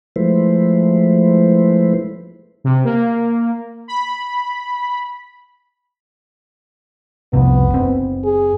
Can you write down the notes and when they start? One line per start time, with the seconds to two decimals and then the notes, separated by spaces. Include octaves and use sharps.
0.16 F3 G#3 A3 E4 B4 C5
2.64 C3
2.85 A#3
3.88 B5
7.33 C2 F2 C3 B3
7.70 F#1 C4
8.24 G#4